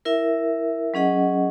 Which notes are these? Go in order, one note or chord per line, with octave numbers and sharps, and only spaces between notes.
E4 A#4 E5
F#3 C#4 G#4 D#5 F#5